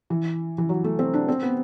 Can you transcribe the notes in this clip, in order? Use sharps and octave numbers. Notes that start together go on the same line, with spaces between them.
E3
E3
F#3
A3
C4
D4
C4
B3